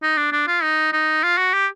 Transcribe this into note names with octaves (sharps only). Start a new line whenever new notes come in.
D#4
D4
D4
F4
D#4
D#4
F4
F#4
G4